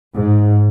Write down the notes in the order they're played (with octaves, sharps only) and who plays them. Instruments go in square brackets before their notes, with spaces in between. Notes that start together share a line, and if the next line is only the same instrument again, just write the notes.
[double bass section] G#2